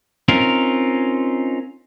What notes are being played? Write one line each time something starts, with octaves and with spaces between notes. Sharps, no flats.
C4 C#4 D#4 F4 A#4